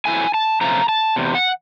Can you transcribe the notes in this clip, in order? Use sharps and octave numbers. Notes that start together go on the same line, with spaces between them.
A2 F#3 A3 C4 E4 G#5
A5
C3 F3 A3 C#4 F4 A#5
A5
E2 C3
F#5